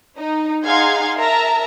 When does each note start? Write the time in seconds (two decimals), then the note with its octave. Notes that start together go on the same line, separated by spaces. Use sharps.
0.18 D#4
0.65 D#4 G#4 F5 F#5 C6 G#6
1.17 A#4 E5 A5 A#5